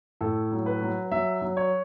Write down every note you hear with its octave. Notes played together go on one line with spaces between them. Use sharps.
A2 A4
F#3
B4
F#3
F#3 E5
F#3
C#5